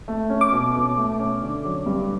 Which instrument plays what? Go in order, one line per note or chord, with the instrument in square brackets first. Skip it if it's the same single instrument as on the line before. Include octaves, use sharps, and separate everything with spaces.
[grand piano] A3
C#4
[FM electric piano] D6
[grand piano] B2
B2
A3
C#4
D3
F#3
G2